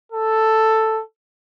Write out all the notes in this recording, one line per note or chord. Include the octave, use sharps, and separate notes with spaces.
A4